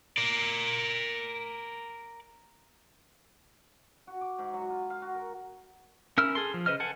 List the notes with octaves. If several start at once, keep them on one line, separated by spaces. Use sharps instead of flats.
A#4 D5
F#4
D6
G#2
F#3
F4
F5
F#4
A#4
C#4 E4 A#4 E6 F6
G#4 A4 C6
F3
C#3 B4 C5 D#5 F6
A4 C5 F#5 G#5